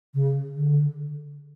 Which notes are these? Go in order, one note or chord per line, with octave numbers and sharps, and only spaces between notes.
C#3
D3